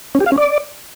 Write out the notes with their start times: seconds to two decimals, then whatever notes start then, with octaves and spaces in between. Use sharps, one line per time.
0.15 C#4
0.20 G4
0.26 F5
0.32 C#4
0.38 D5